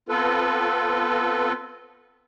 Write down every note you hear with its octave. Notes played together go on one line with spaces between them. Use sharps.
B3 C4 F4 A4 B4